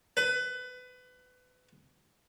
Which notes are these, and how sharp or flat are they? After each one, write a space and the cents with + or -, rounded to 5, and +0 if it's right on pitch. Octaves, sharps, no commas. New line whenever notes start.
B4 +25